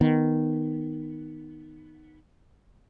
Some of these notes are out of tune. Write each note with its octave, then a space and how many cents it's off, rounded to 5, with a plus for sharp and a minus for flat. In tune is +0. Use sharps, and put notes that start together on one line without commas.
D#3 -5 B3 +0